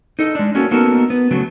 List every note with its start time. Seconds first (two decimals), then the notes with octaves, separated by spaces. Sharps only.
0.19 D#4 A4 D#5
0.35 G#3 D4
0.55 A#3 C#4 F#4 A4
0.71 A#3 B3 D#4 F#4 A4 A#4
1.10 B3
1.31 C#3 F#3 A3